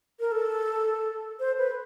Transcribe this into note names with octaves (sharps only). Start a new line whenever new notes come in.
A#4
A4
C5
B4